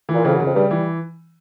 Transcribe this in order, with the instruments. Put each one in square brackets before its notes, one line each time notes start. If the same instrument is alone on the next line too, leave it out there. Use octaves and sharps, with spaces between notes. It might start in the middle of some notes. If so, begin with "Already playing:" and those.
[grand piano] E3
[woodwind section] A#2
[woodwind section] F2 [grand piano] C#3
[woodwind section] F#2
[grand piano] C#3
[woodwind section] F2
[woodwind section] G2 [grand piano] G3
[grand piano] E3